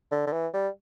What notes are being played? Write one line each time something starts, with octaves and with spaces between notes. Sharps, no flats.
D3
D3
E3
G3